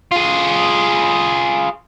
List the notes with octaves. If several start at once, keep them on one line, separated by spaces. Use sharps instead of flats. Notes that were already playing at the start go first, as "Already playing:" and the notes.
F4 G#4